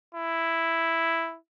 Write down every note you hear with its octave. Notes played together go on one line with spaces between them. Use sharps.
E4